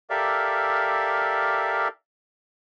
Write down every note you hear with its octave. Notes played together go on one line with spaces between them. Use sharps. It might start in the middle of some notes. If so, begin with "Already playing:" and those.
G4 A4 A#4 D5 E5 F5